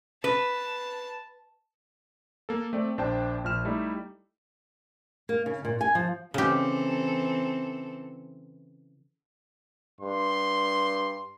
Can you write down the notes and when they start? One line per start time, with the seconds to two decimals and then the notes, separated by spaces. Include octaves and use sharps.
0.24 B4 A5
2.49 A#3 A4
2.73 A3 C4 D5
2.98 A#1 D4 C5 G5 A5
3.44 A#1 F3 F6 E7
3.65 G3 A3 D#4 E4
5.29 A#3
5.46 C#3
5.65 A#2
5.81 G#5
5.95 F3
6.34 C#3 E3 C4 G4 A4
10.01 G2 C6